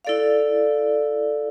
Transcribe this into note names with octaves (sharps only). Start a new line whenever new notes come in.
E4 A4 D5 F5